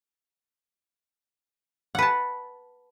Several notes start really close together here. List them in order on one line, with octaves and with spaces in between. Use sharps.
F#5 B4 A5